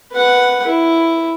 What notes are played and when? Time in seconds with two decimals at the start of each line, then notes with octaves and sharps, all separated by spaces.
0.11 B4 F#5
0.67 E4